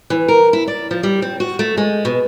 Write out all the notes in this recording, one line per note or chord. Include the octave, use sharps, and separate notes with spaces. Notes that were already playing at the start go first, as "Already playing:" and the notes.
E3
A#4
E4
D5
F3
G3
C4
F#4
A3
G#3
B2